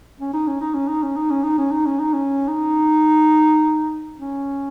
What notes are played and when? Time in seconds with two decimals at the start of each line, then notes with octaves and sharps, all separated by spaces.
0.20 C#4
0.33 D#4
0.47 C#4
0.61 D#4
0.74 C#4
0.88 D#4
1.03 C#4
1.17 D#4
1.31 C#4
1.44 D#4
1.58 C#4
1.72 D#4
1.86 C#4
2.00 D#4
2.14 C#4
2.48 D#4
4.18 C#4